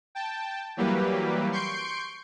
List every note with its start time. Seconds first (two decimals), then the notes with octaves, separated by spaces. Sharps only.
0.15 G5 A5
0.77 E3 F#3 G3 A#3 G4 B4
1.52 C6 C#6 G6 C7 D7